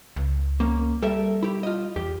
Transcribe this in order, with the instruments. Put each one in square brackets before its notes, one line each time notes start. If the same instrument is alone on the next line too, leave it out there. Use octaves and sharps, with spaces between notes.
[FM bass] C#2
[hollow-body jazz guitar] A#3 C#4
[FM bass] G3 [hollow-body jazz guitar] A4 A#4 E5
[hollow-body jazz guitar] E4 G4
F4 D#5
[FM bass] E2 [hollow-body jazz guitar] G4